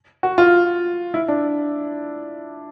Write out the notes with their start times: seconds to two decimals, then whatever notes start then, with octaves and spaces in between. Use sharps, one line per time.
0.23 F#4
0.38 F4
1.14 E4
1.28 D4